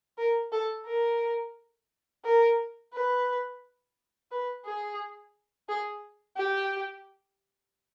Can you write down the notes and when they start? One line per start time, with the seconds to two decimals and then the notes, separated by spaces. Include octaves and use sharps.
0.18 A#4
0.52 A4
0.87 A#4
2.25 A#4
2.94 B4
4.31 B4
4.66 G#4
5.69 G#4
6.37 G4